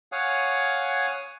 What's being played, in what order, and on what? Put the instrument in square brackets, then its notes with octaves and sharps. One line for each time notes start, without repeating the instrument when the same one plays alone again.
[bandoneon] C#5 F5 F#5 G#5 D#6